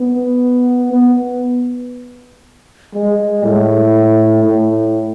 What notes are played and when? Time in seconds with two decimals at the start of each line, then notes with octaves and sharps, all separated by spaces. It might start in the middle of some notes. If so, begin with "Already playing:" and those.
Already playing: B3
0.93 B3
2.94 G#3
3.44 A2
4.44 A2